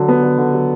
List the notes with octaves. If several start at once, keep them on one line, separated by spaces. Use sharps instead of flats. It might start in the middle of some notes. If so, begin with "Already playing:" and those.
Already playing: D3 F#3
B3
D3
D3
F#3